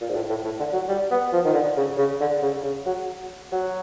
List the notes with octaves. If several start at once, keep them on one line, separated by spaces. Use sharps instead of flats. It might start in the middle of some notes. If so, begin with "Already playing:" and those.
A#2
G#2
A2
A2
A2
D3
F#3
G3
B3
F3
D#3
D3
C#3
C#3
D3
C#3
C#3
F#3
F#3